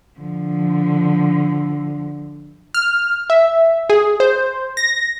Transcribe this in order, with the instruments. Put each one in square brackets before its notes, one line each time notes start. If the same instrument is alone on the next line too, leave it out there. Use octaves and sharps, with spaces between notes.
[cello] D3 F3
[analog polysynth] F6
E5
G#4
C5
A#6